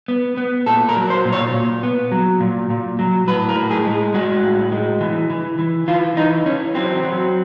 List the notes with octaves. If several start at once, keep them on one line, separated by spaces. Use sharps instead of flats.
B3
B3
A#2 A4
A#4
F#3
C5
A#2
C#5
A#2
B3
F#3
A#2
A#2
F#3
A2 B4
A#4
A2
G#4
G#3
G#3 F#4
A2
G#3
E3
E3
E3
E3 F4
E3 D#4
E3 C#4
F#3 C4
F#3